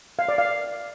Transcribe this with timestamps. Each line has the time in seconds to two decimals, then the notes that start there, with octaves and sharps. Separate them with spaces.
0.19 F5
0.28 D5
0.38 F5